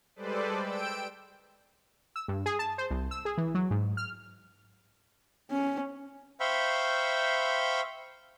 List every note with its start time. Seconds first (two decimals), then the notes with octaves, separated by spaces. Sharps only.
0.16 G3 G#3 A4 B4 C5 D5
0.62 G5 E6 D7
2.16 E6
2.28 G2
2.46 G#4
2.59 A5
2.78 C5
2.90 C2
3.11 E6
3.25 G#4
3.38 E3
3.55 F#3
3.71 G#2
3.97 F6
5.51 C#4
6.40 C5 E5 F5 G5 B5 C#6